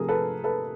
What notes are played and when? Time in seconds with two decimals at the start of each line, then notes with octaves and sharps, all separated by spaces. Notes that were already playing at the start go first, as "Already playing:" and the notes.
Already playing: C3 F3 A3 C4 G#4 A#4
0.08 A4 B4
0.44 A4 B4